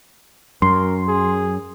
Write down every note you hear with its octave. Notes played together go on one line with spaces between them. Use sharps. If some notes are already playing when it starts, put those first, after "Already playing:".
F#2 A#4 C6
G#4